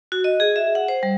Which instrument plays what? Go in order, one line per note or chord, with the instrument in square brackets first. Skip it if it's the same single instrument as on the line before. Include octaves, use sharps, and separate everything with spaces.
[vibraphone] F#4
D#5
G#4
E5
F#5
C5
G3